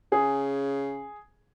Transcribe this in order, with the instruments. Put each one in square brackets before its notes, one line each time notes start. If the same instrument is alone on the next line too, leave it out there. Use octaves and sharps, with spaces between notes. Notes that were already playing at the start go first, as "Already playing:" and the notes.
[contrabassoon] C#3 [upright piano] G#4